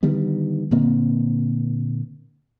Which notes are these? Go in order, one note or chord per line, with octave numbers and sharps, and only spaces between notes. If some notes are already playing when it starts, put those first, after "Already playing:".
D3 D#3 G3 B3
A#2 D3 A#3 C4